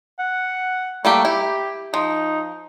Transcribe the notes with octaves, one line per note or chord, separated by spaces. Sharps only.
F#5
G3 A3 A#3 G4
E4 G4
F3 D#4